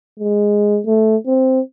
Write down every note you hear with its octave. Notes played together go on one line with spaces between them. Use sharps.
G#3
A3
C4